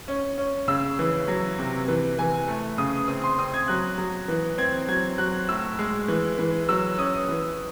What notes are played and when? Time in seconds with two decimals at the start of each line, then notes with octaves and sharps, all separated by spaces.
0.08 C#4
0.38 C#4
0.68 C#3 E6
0.99 E3
1.28 F#3
1.58 C3
1.88 E3
2.18 E3 G#5
2.48 A3
2.78 C#3 D#6
3.08 C4 D#6
3.24 C6
3.38 C4 D#6
3.54 G#6
3.68 F#3 F#6
3.98 F#3
4.28 E3
4.58 C4 G#6
4.88 F#3 G#6
5.18 F#3 F#6
5.49 A2 E6
5.79 G#3
6.08 E3
6.39 E3
6.69 F#3 E6
6.98 C#4 D#6
7.29 E3